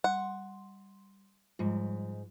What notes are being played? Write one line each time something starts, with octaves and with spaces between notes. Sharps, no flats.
G3 F#5 C6
G#2 F3 G3 F4